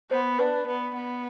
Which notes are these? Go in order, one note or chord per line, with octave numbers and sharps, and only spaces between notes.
B3 C5
D4 B4
B3
B3